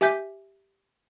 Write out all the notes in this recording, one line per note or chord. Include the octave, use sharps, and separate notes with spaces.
G4 E5 G#5 D6 G6 B6